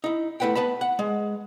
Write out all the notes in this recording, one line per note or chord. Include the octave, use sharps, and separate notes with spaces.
D#4 E4
A3 E4 B4 F#5 G5
B3 B4 A5 B5
F#5
G#3